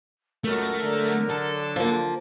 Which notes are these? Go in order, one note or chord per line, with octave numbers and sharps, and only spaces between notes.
C#2 F#2 A3 F#4 A#4
D3 F#3
A4
F3 A#3